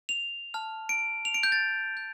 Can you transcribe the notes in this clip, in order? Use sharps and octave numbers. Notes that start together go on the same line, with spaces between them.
F7
A5 F6
D7
F7
D7
G6
A6
G6